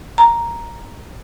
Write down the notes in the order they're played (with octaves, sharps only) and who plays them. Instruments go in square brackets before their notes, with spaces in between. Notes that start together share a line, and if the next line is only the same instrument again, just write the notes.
[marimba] A#5